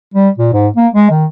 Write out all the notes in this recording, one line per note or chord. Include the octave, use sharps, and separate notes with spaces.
G3
A#2
G#2
A#3
G#3
D#3